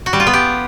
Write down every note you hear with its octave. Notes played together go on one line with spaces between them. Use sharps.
F#4
G3
F4
B3
G4